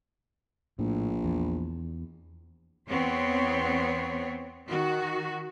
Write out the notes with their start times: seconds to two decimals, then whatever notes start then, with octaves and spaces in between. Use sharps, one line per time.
0.79 A#1 A2
1.24 E2
2.88 E2 B3 C4 C#5
4.67 D#3 F#4